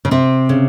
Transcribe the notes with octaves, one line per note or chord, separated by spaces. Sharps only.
C#3
C3 C4
C#3